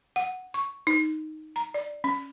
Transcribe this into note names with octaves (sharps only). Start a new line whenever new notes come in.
F#5
C#6
D#4
A#5
D5
C#4